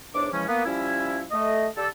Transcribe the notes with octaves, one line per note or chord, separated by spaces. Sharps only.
E2 G#2 D4 C#5 D6
C#3 E3 F3 G#3 C#4
A#3 B3
F3 G3 C#4 E4
A3 D#5
D3 G4 A4